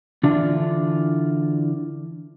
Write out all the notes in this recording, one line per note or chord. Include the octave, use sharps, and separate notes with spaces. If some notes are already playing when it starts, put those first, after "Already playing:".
D3 E3 D4 F4